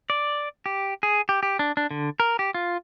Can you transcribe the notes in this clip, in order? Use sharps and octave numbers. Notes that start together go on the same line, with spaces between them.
D5
G4
G#4
G4
G4
D4
D4
D3
A#4
G4
F4